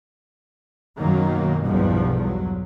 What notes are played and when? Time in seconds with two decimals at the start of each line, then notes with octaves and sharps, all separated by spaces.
0.98 F#2 B2 D#3 F#3 A#3
1.65 B1 E2 G2 B2 F3 G3
2.23 F#3